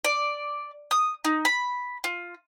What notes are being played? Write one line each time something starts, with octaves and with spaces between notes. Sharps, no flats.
D5
D#6
D#4
B5
F4